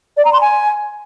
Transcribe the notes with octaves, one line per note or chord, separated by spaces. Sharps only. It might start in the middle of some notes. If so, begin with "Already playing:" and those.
D5
A#5
C6
G#5